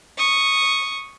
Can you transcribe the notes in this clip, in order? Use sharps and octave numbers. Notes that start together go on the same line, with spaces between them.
C#6 D#6